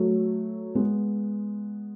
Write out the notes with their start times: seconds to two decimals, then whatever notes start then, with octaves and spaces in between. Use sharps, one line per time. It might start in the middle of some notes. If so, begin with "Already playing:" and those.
Already playing: F#3 A3
0.75 G#3 B3